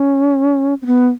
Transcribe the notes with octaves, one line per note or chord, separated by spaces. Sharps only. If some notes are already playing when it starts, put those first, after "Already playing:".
Already playing: C#4
C4
B3